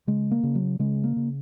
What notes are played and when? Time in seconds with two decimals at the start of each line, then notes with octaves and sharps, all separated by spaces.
0.07 C#3 G#3
0.31 A#3
0.43 C#3
0.55 F#3
0.79 C#3 G#3
1.04 A#3
1.16 C#3